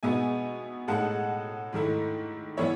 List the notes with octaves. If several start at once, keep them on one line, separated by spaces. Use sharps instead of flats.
B2 G#3 B3 D#4 E5 G#5
A2 G#3 D#4 F#5 A5
G#2 D#3 A3 E4
E3 B3 E4 C#5 E5